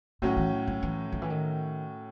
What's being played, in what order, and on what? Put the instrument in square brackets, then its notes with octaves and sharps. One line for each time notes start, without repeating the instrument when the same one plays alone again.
[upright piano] A2 F#3 C#4 F#4 [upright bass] D#3
[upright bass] E3
E3
E3
D#3
E3
D#3